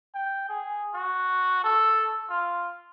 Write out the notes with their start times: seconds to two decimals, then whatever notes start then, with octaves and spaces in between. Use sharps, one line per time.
0.14 G5
0.49 G#4
0.94 F#4
1.63 A4
2.30 F4